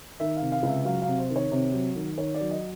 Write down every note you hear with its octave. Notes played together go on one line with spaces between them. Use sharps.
D#3 E5
F5
C3
F5
C#2
E5
F#3 F5
F5
C3
C5
D#3
C#5
C3
F#3
D#3
D#3 C#5
D5
F#3
D#5